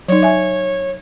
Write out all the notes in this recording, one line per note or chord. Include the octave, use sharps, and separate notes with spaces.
F#3 D#4 C#5
E5 G#5